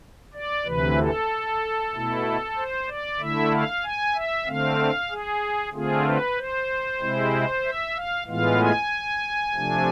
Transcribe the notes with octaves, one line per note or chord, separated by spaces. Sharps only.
D5
D2 C3 E3 B4
A4
B2 A3 E4
C5
D5
D3 A3 E4 E5
F5
G#5
E5
D3 A3 C4 F5
G#4
D3 A3 C4 F4 G#4
B4
C5
C3 G#3 C4 E4
E5
F5
A2 E3 G#3 B3 F4 F5
G#5
C3 F3 A3 D4